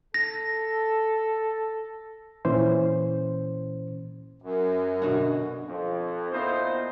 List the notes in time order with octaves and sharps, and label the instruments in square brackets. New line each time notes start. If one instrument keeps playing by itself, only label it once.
[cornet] A4 [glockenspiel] A#6
[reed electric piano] A#2 E3 C#4 C5
[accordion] F#2
[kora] B2 D3 F#4
[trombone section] F2
A#2 B3 D#4 E4 C5